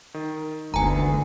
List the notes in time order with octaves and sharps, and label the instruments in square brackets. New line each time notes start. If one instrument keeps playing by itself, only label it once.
[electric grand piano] D#3
[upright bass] F#1 [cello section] D2 [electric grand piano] D#3 E3 B3 [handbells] G#5 A#5